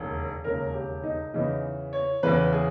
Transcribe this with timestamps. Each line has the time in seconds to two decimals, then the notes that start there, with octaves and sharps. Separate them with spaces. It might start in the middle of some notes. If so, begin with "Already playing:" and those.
Already playing: E1 D#2 C#3
0.44 E1 D#2 C#3 A#4
0.74 G4
1.03 D#4
1.34 E2 C#3 E3 D#4
1.93 C#5
2.23 E2 C#3 E3 B4
2.53 G#4